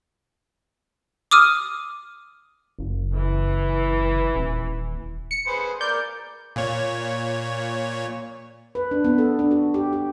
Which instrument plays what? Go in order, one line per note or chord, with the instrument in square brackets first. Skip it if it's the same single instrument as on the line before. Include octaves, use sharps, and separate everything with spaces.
[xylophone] D6 D#6 F6 D#7
[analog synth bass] F#1
[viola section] E3
[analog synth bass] D#1
[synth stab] C#7
[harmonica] G#4 B4 C5
[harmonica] A#4 D5 [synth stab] G6
[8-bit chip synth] A#2 C#5
[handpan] B4
D4
B3
A4
D4
F#4
G4
G4